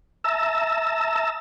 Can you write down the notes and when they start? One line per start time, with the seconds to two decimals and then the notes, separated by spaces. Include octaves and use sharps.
0.24 E5 A5 A#5 E6